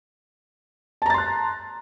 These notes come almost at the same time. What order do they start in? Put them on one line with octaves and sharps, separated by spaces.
A5 A#5 A6 C6 F#6